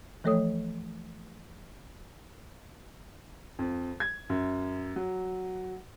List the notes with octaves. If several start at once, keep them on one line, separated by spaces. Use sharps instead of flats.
E3 F3 A3 A4 C#5 D#6
F2
G#6
F#2
F#3